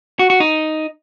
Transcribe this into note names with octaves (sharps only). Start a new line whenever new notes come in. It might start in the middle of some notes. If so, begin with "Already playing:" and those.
F#4
F#4
D#4